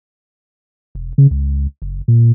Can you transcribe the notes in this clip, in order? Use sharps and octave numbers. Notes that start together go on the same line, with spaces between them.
E1
C#3
C#2
F#1
A#2